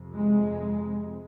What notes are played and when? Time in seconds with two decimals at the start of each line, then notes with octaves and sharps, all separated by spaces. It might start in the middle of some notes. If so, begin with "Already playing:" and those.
Already playing: F2 C3
0.14 G#3